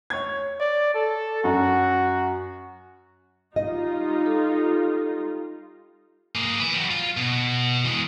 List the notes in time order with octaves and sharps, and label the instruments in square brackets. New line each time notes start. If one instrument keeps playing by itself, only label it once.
[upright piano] C#5 G#6
[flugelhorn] D5
A4
[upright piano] F#2 [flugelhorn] F#4
[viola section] G3 D#4 F4 [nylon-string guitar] D#5
[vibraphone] A4
[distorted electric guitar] A#3 G#4
B4 E5
F#3 G3
F4
B2
E3 G#3